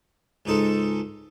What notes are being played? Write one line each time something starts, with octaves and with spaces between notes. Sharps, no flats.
C#2 G#2 D#4 A4 C6